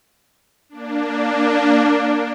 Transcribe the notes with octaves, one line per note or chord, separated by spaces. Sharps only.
A#3 D4